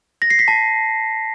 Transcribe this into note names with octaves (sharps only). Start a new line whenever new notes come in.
A#6
C7
B6
A5